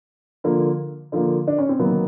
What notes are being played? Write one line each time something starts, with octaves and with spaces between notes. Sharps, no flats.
D3 F3 A#3
D3 F3 A#3
D4
C#4
C4
D#3 F#3 A#3 B3